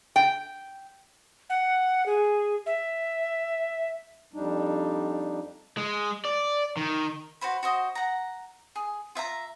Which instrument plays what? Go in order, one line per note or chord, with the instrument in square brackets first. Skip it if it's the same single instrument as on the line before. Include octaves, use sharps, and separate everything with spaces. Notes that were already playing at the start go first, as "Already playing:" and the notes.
[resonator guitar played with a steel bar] G5
[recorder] F#5
G#4
E5
[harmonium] F2 G3 D4 D#4
[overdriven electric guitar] G#3
D5
D#3
[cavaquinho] F#4 B4 C5 B5
F#4 C5 D#5
F#5 A#5
G#4
F4 E5 G5 A#5